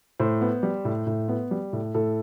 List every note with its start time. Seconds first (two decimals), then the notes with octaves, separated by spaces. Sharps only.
0.20 A2 C5
0.41 B3
0.63 G3
0.85 A2
1.07 A2
1.28 B3
1.51 G3
1.73 A2
1.95 A2 A4